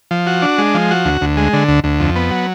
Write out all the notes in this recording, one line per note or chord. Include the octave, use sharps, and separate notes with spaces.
F3
F#4
D4
G#3
F3
F#4
D2
D2
G#3
D3
D2
D2
F2
B3
F#3